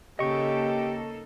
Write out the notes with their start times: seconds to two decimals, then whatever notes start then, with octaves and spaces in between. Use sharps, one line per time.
0.19 C#3 A#3 D#4 G4 A4 D#5 C#6